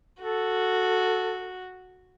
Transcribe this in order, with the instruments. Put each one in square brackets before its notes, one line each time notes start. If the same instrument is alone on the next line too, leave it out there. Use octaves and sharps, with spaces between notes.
[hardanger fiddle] F#4 [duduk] A4